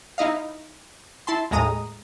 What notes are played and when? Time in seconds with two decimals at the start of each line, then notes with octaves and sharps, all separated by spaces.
0.18 D#4 E4 D#5 F5
1.27 E4 A5 C6
1.51 D#2 A2 G#3 A#5 D#6